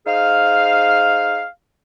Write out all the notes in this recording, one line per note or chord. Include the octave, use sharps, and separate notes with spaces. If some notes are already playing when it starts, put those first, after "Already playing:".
D#4 G#4 C5 F5